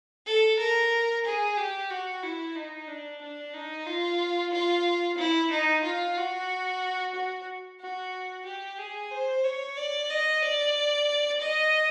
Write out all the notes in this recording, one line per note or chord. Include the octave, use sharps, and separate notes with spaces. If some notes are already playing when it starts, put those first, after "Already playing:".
A4
A#4
G#4
G4
F#4
E4
D#4
D4
D4
D#4
F4
F4
E4
D#4
F4
F#4
F#4
F#4
G4
G#4
C5
C#5
D5
D#5
D5
D#5